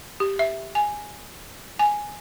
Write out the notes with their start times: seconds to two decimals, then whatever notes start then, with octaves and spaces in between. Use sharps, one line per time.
0.20 G4
0.39 E5
0.75 G#5
1.79 G#5